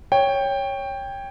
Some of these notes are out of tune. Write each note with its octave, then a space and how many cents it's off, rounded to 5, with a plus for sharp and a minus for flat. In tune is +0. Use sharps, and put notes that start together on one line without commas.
C#5 +0 G5 +10